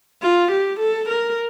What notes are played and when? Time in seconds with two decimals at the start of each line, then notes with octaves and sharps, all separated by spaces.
0.22 F4
0.51 G4
0.80 A4
1.09 A#4